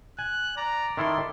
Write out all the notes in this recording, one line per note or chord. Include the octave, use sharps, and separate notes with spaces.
G#5 F#6
D5 A#5
D#3 E4 A4 C6